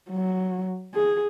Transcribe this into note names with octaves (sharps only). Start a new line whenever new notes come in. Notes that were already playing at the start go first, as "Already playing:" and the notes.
F#3
G#4